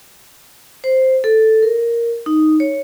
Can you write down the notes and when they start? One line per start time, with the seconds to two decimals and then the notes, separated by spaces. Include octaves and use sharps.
0.84 C5
1.24 A4
1.63 A#4
2.26 D#4
2.60 C#5